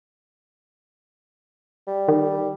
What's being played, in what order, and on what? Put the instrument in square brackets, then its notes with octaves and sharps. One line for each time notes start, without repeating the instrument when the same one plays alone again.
[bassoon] G3
[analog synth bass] D#3